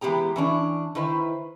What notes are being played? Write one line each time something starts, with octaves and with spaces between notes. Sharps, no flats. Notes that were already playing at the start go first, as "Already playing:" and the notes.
E3 G#3 B3 G4 A#5
E3 C#4 D4
D#3 E4 B4 C5